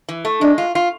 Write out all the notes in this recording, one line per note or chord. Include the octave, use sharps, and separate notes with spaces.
E3
A3
G#3 D4
F4
F4